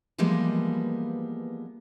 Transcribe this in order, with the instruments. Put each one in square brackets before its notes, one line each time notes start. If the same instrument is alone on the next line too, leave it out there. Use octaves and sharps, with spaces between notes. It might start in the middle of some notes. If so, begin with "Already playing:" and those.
[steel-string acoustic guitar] E3 F3 G3 G#3 A#3 B3